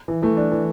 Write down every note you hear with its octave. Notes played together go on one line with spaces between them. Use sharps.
E3
E3 A3
D4
E3